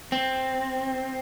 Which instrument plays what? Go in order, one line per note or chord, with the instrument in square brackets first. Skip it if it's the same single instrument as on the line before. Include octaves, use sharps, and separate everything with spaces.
[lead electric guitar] C4